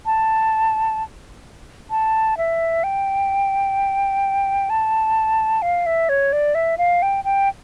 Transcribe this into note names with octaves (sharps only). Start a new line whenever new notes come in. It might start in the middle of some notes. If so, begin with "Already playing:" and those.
A5
A5
E5
G5
A5
F5
E5
C#5
D5
E5
F5
G5
G5